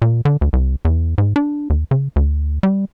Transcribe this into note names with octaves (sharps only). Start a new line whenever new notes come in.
A#2
D3
D2
C2
E2
G#2
D4
D#2
C#3
D2
G3